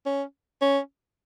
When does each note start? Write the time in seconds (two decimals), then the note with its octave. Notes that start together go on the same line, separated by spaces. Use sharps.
0.06 C#4
0.62 C#4